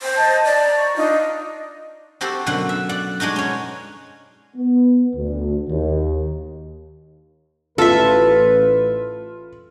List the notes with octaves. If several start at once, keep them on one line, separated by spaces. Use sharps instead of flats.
C5
D#5 A5
D5
A#5
C#6
D4 D#4 F4 D#5
C4 F#4 G4 A4 C5
F#2 B2 D3 F#5
E5
D5 F#5
G#3 D4 D#4 F#4
C#4 C#5
B3
D2
D#2
A1 F4 A4 B4 E5